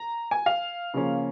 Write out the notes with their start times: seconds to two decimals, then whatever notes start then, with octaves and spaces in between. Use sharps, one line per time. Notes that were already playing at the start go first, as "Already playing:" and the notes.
Already playing: A#5
0.31 G#5
0.46 F5
0.94 C#3 F3 A#3 C#4